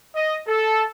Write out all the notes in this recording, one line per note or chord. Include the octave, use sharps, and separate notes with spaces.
D#5
A4